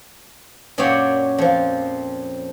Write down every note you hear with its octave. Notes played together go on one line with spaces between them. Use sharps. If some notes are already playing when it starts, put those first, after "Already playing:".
F#2 A#2 F#3 G4 C#5 D5
F2 F3